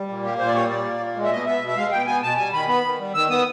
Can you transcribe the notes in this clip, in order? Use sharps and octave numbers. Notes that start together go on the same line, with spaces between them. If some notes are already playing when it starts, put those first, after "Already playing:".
Already playing: G3
A#2
A#3 G4
A#2 C5
D5
G3 C#5
A#2 D5
A#3
A#2
G#3
E5
B2 D#5
B3 E5
B2
E5
G#3 F5
B2 G5
B3 G#5
B2 A5
G3 G#5
D#3 B5
B3 B5
D#3
G3
D#3 E6
B3 D#6